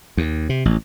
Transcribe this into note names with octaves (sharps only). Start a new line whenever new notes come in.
D#2
C3
A1